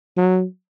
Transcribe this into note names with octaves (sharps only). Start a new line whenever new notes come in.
F#3